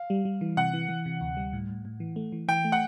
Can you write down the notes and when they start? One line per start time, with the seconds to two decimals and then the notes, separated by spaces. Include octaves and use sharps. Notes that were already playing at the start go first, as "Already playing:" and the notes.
Already playing: F5
0.10 G3
0.25 G3
0.41 E3
0.57 C3 F#5
0.73 E3
0.89 E3
1.06 C3
1.21 D2
1.37 G3
1.53 A2
1.69 A2
1.85 A2
2.00 E3
2.16 A3
2.32 E3
2.48 E3 G5
2.65 A3
2.72 F#5